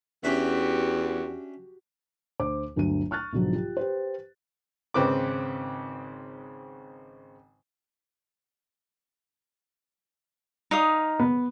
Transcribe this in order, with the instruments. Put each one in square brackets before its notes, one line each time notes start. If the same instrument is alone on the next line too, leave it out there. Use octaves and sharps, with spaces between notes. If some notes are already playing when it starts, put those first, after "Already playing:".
[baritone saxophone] E2 [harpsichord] C#4 D4 E5 [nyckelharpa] F#4 G4
[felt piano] D2 C5 D6
G1 D2 F#3 D#7
C#6 F6 F#6 A6
B1 G#2 D3 F3 F#3
F4 G4
G4 B4 C5
[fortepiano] G#1 C#3 C4 B4 D6
[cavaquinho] D#4 F5 D#6
[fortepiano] B3